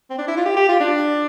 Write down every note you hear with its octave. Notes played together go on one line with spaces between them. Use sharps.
C4
D4
E4
F4
G4
G4
F4
D4